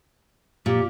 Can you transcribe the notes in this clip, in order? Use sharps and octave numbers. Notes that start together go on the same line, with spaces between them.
A#2 G4